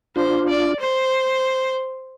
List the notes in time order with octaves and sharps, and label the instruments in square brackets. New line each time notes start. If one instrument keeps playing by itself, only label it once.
[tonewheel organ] D4 F4 [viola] C5
[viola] D5
C5